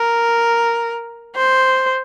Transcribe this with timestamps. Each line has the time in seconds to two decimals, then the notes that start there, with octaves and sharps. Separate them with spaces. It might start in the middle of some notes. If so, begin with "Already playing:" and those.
Already playing: A#4
1.36 C5